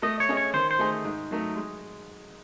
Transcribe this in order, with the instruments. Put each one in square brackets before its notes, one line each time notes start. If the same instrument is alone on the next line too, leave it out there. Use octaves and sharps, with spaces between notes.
[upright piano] A3 [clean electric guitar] D#5
[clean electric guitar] C#5
[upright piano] C#4 G#4 D#5
[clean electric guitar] C#5
[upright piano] D#3 [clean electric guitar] C5
[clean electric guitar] C5
[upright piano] A3 D#4 G#4
G#2
F#3 A3 D#4
G#3